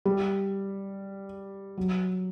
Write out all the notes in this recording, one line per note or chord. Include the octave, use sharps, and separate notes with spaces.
G3
F#3